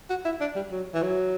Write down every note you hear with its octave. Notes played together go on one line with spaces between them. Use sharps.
F#4
E4
D4
G3
F#3
E3
F#3